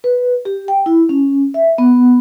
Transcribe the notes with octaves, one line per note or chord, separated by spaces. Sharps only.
B4
G4
G5
E4
C#4
E5
B3